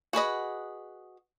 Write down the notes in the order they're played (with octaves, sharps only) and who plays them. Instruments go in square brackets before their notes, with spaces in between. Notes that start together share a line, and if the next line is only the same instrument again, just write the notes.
[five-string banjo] F#4 G#4 B4 D#5